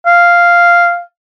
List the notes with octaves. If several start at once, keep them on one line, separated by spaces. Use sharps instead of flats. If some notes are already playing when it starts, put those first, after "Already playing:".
F5